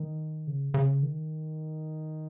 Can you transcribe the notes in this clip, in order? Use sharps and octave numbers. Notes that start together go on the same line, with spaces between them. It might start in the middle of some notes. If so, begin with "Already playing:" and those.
Already playing: D#3
C#3
C#3
D#3